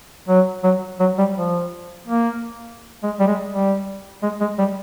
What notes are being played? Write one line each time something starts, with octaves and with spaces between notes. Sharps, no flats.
F#3
F#3
F#3
G3
F3
A#3
G#3
G3
G#3
G3
G#3
G#3
G3